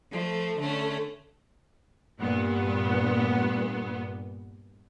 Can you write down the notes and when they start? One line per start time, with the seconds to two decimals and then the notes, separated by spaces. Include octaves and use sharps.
0.12 F3 A3
0.60 D3 A3 C#4
2.19 G2 A#2 B3